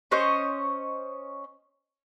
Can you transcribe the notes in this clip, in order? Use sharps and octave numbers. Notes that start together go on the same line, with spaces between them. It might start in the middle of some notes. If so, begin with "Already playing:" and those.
C#4 C5 C#5 D#5